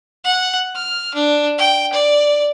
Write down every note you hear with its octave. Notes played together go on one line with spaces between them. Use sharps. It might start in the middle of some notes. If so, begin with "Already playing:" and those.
F#5
F6
D4
G5
D5